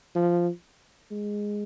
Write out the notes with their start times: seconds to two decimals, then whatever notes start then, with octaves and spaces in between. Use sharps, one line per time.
0.15 F3
1.11 G#3